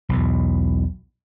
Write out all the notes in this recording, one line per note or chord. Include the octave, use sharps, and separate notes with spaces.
B1 E2 B2